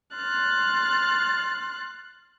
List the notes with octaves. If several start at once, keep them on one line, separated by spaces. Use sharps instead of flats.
C6 F6 F#6 A6